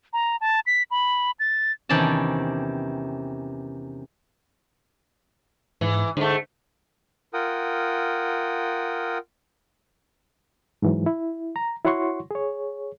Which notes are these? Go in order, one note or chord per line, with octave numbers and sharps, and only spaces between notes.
A#5
A5
B6
B5
A6
E2 C3 D#3 C#4 D5 A5
G#2 E3
G#2 D3 A3
F4 A#4 F#5 G5 D#6
G#2 E3 F#3
E4
A#5
E4 F#4 C#5 F#5 C6 C#6
G#4 C#5